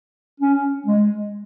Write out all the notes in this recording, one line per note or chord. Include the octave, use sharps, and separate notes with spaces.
C#4
G#3